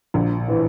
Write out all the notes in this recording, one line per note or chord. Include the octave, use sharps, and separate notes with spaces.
A#1
A2 E3